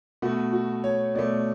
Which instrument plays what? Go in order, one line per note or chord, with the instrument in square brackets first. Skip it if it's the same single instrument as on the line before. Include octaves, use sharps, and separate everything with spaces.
[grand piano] B2 A3 F#4
F#4
C#5
B2 A3 D5